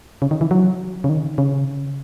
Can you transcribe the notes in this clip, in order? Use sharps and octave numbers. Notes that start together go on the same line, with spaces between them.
C#3
D#3
E3
F#3
C#3
D#3
C#3